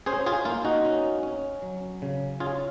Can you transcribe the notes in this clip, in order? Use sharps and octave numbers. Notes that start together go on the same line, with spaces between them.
C#4 G#4 C5
F4 G#4
A#3 F4
D#4 F#4
C#4
C#4
F#3
C#3
C#4 F4 G#4